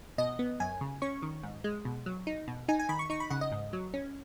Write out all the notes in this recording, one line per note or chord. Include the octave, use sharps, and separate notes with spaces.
B2 D#5
B3
F#2 G#5
C#3
C#4 C#6
D#3
G#2
G#3
B2
F#3
D#4
B2
D#4 G#5
G#5
D#3 B5
C#6
D#4 C#6
B5
C#3 F#5
D#5
G#2
F#3
C#4